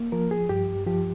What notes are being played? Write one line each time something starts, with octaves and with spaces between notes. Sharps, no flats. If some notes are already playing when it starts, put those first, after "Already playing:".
Already playing: A#3
F3 A#4
G#4
G2 G4
F3 G4